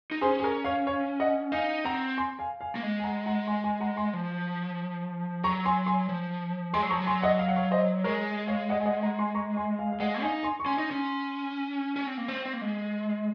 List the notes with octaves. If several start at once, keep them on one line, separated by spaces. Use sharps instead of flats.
D#4
C#4 G#4 C5
G#4
A#4
C#5 F5
C#5 F5
D#5 F#5
D#4 F5 G#5
C4 F#5 A#5
G#5 C6
F5 G#5
F5 G#5
A#3
G#3
G#5
F#5 A#5
F#5 A#5
G#5 C6
G#5 C6
F#5 A#5
G#5 C6
F3
F#3 A#5 C#6
G#5 C6
G#5 C6
F3
G#3 G#5 C6
F#3
F3 A#5 C#6
F#3
G#5 C6
D#5 F#5
F5
F#5
C#5 F5
C5 D#5
G#3 A#4 C#5
C#5 F5
D#5 F#5
G#5
D#5 F#5
F#5 A#5
G#5 C6
A#5 C#6
G#5 C6
F5 G#5
F5
G#3 D#5 F#5
D#4 F5 G#5
G#5 C6
C#6
C#4 G#5 C6
D#4
C#4
C#4
C4
A#3
C4
C4
A#3
G#3